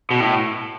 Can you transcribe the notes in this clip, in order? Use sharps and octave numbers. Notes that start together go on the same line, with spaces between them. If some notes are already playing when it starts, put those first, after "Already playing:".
B2
A2